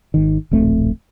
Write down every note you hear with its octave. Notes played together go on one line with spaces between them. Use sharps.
G#1 D#3
D1 A#1 A3 C4